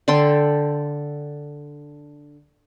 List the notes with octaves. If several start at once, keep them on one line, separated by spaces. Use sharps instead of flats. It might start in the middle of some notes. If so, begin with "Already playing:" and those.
D3 A4 G5 C6